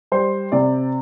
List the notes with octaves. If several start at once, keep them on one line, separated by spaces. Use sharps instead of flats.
G3 C5
C3 D5